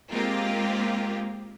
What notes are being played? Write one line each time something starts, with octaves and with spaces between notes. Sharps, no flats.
G#3 A#3 C4 F4 G4